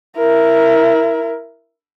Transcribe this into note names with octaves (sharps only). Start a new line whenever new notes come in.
E4 A#4